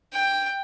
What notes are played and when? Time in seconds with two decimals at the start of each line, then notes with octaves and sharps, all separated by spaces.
0.13 G5